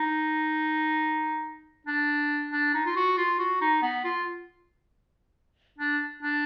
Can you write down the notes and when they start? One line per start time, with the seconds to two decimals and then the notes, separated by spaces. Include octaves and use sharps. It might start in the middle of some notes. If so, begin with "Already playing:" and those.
Already playing: D#4
1.87 D4
2.51 D4
2.74 D#4
2.86 F4
2.96 F#4
3.17 F4
3.39 F#4
3.61 D#4
3.82 B3
4.04 F4
5.78 D4
6.23 D4